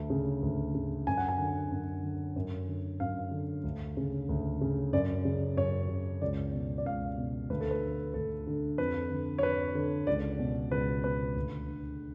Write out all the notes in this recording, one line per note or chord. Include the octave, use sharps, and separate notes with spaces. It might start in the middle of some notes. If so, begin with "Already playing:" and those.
Already playing: D2
C#3
D2
C#3
F#2 G#5
F#5
G#5
D3
F#2
D3
F#2
D3
F#2 F5
D3
D2
C#3
D2
C#3
F#2 D5
C#3
F#2 C#5
C#3
C#2 D5
B2
D5
C#2 F5
B2
D2 B4
A4
B4
D3
D2 A4
D3
F2 B4
D3
C#5
F2 B4
D3
C#2 D5
B2
C#2 B4
B2 B4
D2
D3